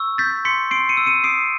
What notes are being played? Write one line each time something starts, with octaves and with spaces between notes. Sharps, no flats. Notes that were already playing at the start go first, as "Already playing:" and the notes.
Already playing: C#6 E6
G6 A6 B6
C6 B6 C#7
C6 C7 D7
C#7 D#7
E6
C#7 D#7
D#6 C7 D7